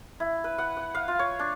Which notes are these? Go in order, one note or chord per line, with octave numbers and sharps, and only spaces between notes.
E4
B4
F#5
F#5
F5
F4
C#5
D4